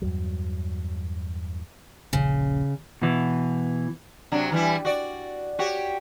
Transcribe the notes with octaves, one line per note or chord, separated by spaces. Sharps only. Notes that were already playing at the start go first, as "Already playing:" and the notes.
E2 G2 F#3
D#1 A#1 C#3 C#4
B2 E3
C3 F#3 D4
E3 G3 E4
F#4 D5
F#4 G4 C#5